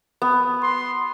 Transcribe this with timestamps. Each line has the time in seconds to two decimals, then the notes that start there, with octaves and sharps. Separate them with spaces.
0.22 B3
0.62 C6